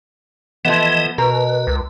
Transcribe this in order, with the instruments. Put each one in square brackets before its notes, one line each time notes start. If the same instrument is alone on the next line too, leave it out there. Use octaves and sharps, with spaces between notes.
[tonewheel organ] E3 D#5 [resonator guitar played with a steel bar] F3 A3 B3
[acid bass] B2 [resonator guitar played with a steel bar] A#4 [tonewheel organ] B4
[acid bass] C#2